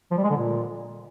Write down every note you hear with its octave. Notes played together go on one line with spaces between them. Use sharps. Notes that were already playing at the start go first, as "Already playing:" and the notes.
F3
G3
G#3
D3
A#2